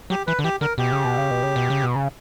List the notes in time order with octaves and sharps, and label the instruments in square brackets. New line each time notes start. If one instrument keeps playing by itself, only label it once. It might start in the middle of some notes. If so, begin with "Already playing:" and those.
[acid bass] F#3 [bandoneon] G4
[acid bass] E3 [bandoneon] B4
[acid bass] D3
[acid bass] E3 [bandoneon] G4
[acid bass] D3 [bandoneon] A#4
[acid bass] B2 [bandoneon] G4
[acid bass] C#3
B2
C#3
B2
C#3
B2
C#3
B2
C#3